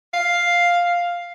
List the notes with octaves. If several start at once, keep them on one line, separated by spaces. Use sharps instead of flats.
F5